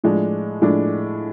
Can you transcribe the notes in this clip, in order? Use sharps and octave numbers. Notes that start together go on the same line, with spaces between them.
A2 F3 G#3 D4
A2 F3 G#3 D4